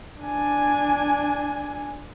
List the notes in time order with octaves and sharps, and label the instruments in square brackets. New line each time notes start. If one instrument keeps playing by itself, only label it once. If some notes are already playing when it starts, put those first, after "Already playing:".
[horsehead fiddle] D4 G#5